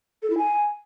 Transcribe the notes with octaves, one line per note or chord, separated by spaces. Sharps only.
A4
E4
G#5